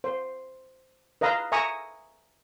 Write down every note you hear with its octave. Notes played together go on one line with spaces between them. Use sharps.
C5
B4 D#5 F5 A#5 C6 E6
E5 G#5 A#5 C#6 D#6